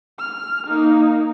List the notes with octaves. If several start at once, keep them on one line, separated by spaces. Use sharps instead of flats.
F6
A#3 D#4